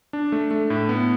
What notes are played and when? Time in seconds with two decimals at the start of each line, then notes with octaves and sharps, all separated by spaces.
0.13 D4
0.32 A3
0.51 A3
0.70 A2
0.89 B3